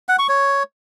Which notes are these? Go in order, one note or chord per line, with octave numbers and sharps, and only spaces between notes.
F#5
C#6
C#5